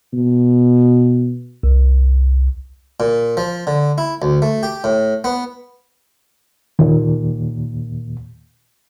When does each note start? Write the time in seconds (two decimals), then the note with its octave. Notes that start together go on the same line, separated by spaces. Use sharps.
0.13 B2
1.63 C2
3.00 A#2
3.37 F3
3.67 D3
3.98 E4
4.22 D2
4.42 A3
4.63 G4
4.84 A2
5.24 B3
6.79 D#2 A#2